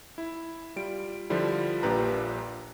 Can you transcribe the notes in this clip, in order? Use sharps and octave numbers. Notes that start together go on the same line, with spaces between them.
E4
G3 F4 D7
D3 F3 G3 E4 F4
A#1 A#2 D4 G4 B4 A#5